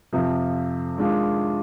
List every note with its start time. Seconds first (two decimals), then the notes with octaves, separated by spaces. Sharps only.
0.13 F2 C3 F3
0.97 D#3 G#3 D4 F4